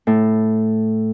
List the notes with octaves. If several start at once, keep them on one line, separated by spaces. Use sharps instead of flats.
A2